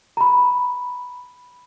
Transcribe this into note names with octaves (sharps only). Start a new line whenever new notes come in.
A#5 B5